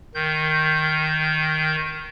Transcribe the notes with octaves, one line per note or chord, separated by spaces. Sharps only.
D#3 G6